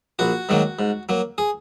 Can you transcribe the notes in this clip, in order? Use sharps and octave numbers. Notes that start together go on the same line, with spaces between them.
A#1 F#4
G#2 D#3 F#3 A#3
G#2
F#3 A#3
G#4